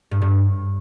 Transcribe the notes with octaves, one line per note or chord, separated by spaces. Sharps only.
G2
G2